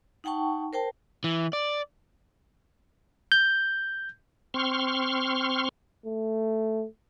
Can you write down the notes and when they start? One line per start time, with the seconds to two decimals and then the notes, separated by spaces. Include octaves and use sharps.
0.24 D#4 F#5 G5 A5 C#6
0.73 A#4 C5 G5 A5
1.24 E3
1.53 D5
3.32 G6
4.54 C4 C6 C#6 F6
6.06 A3